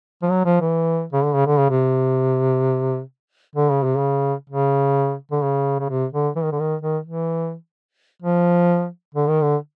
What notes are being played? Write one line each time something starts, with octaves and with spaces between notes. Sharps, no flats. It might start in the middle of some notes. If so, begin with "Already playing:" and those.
F3
F#3
F3
E3
C#3
D3
C#3
D3
C#3
C3
D3
C#3
C3
C#3
C#3
D3
C#3
C#3
C3
D3
E3
D#3
D3
D#3
D#3
E3
F3
D3
D#3
D3